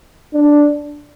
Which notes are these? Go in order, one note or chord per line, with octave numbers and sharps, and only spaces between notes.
D4